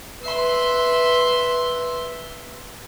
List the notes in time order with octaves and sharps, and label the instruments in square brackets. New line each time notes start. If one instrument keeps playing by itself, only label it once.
[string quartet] B4 E5 C6